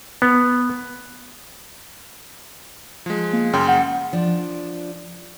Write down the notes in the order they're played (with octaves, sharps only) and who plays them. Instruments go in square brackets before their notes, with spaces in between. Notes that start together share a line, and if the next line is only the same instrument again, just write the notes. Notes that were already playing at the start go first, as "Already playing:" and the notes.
[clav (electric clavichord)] B3
[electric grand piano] F3 G#3
[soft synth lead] A#3
[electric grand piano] F#2 C#3 G5 [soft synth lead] C6
[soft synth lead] F#5
[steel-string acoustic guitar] F3 D4